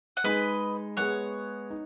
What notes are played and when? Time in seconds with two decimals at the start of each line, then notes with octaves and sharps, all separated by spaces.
0.17 F#5
0.24 G#3 D#4 G#4 B4 D#5
0.97 G#3 B3 G#4 C#5 F#5
1.70 D#4